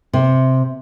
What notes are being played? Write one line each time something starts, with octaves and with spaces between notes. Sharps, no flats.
C3